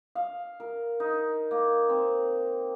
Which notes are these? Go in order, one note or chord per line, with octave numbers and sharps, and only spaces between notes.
F5
A#4
D#4
A#3
C4